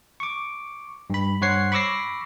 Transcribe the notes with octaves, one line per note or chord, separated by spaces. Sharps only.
C#6 D6
G2 B5
G2 C5 C#5 F#5 G#6 C7
B5 C#6 D6 E6 A#6 C7